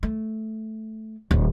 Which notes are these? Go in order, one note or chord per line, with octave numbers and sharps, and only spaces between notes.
A3
D1